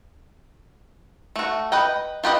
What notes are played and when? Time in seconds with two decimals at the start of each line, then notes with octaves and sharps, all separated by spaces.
1.36 A3 F#4
1.72 B4 D#5 G5
2.24 F4 G4 B4 D#5